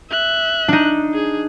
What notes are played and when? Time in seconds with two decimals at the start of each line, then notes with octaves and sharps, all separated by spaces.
0.10 E5 F#6
0.68 D4 D#4
1.14 G#4